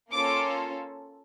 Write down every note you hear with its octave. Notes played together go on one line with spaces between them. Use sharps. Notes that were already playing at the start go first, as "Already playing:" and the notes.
A#3 C#4 F4 A4 D6